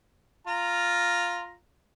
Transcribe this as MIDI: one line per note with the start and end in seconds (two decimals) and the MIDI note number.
0.47 1.55 65
0.47 1.55 82